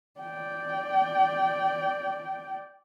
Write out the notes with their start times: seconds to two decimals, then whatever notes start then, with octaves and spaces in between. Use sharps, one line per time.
0.20 D5 G5